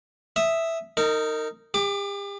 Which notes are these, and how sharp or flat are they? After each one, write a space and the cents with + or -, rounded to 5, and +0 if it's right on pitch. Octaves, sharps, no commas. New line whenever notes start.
E5 +0 D#6 +0
D#4 +0 A#4 -30
G4 +40 D6 +0